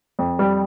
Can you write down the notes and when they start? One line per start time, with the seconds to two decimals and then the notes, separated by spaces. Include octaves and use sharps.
0.19 F2
0.39 G3